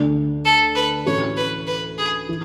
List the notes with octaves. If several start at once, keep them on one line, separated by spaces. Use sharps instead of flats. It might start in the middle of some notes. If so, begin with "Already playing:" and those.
Already playing: D2 D3 A3 D4
A4
B4
A2 E3 A3 C#4 F#4 C#5
B4
B4
G#4
E3